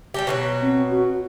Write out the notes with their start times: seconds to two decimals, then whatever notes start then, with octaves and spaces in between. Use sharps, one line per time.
0.14 G3 G#3 G4
0.27 B2 E3 F#3
0.62 C4
0.91 F#4